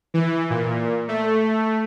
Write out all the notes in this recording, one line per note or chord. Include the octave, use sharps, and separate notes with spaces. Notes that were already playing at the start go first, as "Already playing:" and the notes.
E3
A#2
A3